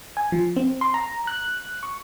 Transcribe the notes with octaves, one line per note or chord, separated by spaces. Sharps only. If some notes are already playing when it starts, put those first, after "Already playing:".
G#5
F3
C4
C6
A#5
F#6
C#6